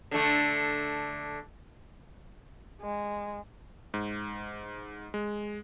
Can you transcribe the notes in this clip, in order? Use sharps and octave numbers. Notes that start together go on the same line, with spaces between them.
D3 A3
G#3
G#2
G#3